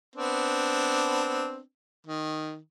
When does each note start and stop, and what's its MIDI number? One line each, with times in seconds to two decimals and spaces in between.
0.16 1.60 59
0.16 1.60 60
0.16 1.60 62
2.07 2.56 51